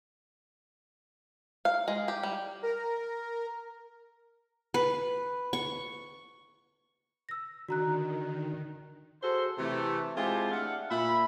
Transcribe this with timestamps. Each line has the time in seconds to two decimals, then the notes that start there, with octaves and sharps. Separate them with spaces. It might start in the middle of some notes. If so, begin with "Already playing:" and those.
1.65 F5
1.88 G#3
2.08 G4
2.23 G3
2.63 A#4
4.74 B4
5.53 C#6
7.29 E6 A#6
7.69 D3 D#3 F#4 A#5 F#6
9.22 F#4 G#4 A4 C5
9.58 C3 E3 A3
10.16 G#3 C4 E4 F4 G4 A4
10.52 A3 D4 F5 F#5
10.91 A#2 E5 B5